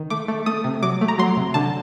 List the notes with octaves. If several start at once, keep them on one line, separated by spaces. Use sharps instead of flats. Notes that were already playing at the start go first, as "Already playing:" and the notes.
Already playing: D#3
A3 D6
A3
A3 D#6
C3
F#3 D6
A3
A#5
F#3 C6
C3
D3 A5